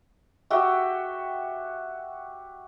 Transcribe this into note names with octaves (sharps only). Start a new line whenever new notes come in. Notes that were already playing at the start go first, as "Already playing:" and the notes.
F#4 G4 E5 G5